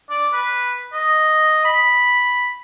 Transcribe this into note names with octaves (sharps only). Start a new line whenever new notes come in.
D5
B4
D#5
B5